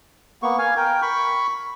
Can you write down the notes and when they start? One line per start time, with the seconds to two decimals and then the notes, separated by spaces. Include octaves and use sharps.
0.43 A#3 B3 C#6
0.58 F5 G#5
0.77 A#4 G5
1.02 B5 C#6